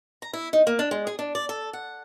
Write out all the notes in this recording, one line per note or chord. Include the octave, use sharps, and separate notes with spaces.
A#5
E4
D#4
A#3
D4
G#3
G#4
D4
D5
A4
F#5